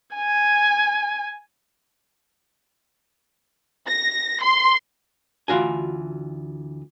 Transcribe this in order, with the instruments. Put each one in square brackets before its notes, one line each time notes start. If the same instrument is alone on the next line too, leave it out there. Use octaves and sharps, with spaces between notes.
[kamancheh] G#5
[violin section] A#6
C6
[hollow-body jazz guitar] D2 E3 F4 F#4 G#5